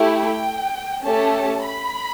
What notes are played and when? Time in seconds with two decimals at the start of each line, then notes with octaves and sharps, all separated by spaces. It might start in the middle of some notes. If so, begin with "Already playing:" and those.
Already playing: A3 E4 G4
0.14 G5
1.04 A3 C#4 G4 A5
1.64 B5